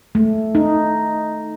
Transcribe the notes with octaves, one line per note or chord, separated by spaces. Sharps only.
A3
D#4